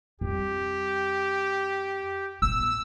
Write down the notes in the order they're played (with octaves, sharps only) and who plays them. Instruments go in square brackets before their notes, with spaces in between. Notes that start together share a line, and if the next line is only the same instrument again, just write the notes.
[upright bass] F2 G3 [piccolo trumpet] G4
[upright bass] A#1 B3 [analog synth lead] E6